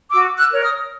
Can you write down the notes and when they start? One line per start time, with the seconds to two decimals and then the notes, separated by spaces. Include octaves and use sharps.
0.11 F#4 D6 E6
0.37 E6 F#6
0.50 A#4 C#5
0.62 D#6 F6